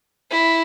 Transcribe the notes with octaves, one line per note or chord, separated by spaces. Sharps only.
E4